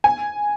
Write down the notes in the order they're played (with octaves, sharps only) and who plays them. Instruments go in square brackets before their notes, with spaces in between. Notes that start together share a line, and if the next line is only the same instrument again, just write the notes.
[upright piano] G#5